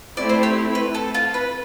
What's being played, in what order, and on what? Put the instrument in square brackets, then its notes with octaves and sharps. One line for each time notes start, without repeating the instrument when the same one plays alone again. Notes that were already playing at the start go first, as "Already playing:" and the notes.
[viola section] A3 C4 E4 [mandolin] D5
[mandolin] C5
G4
B4
A4
F4
B4